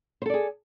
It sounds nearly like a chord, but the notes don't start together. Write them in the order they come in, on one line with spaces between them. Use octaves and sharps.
C5 A4 D5 G#4